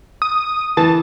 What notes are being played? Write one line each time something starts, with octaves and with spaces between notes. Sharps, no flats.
D#6
E3 A5